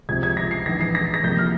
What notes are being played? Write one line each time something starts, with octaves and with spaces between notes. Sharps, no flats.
C#2 C3 F3 G#6
G#6
A#6
C7
A#1 G#2 E3 A#6
C7
A#6
A#6
F2 C3 F3 A#3 G6
F6